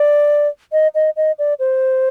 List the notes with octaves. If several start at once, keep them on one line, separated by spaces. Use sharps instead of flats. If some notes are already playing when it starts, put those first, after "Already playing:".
Already playing: D5
D#5
D#5
D#5
D5
C5